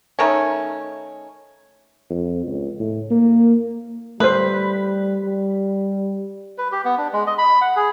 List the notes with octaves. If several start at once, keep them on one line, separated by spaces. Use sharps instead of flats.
D#3 A3 C#4
F2
C#2
A2
A#3
G3 A3 B4 C5
G3
B4
G4
B3
D4
G#3
D#5
B5
F#5
G#4